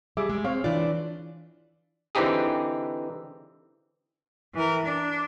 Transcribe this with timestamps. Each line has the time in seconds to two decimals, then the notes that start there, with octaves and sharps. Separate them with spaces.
0.17 G3 G#4 E5 D6
0.29 G#3
0.44 C4 C#5 F5
0.64 E3 D4 F4 D5
2.15 D3 E3 C4 D#4 G4 G#4
4.54 E3 A#4
4.85 D4